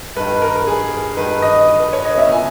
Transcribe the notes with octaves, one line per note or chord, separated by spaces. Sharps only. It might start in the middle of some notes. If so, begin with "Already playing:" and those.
G2 D#3 B4
A#4
G#4
G2 D#3 B4
D#5
B4
C#5
D#5
C#2 B2 E5
G#5